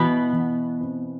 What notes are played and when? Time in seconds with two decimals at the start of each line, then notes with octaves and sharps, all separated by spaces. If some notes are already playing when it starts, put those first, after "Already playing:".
Already playing: B2 E3 B3
0.33 E3
0.80 C4